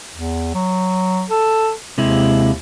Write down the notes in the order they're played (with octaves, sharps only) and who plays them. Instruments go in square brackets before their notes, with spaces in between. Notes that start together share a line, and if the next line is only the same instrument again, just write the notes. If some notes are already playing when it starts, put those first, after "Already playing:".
[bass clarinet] E2
F#3
A4
[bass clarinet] D#2 [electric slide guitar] C3 G#3 E4